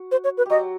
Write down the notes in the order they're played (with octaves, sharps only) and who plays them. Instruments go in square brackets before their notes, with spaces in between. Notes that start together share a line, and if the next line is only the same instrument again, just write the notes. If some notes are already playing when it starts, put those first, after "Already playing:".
Already playing: [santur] F#4
[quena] C5
C#5
B4
[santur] F#3 F#4 G4 [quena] D#5